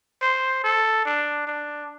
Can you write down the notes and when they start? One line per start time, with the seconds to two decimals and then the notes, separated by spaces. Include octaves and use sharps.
0.22 C5
0.64 A4
1.05 D4
1.47 D4